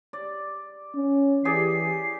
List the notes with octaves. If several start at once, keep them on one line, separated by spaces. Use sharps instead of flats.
D5
C#4
E3 G4 G#4 D5 C7